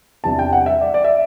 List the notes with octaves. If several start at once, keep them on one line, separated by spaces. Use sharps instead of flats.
E2 C3 G3 D4 A5
G5
F#5
E5
D5
D5
E5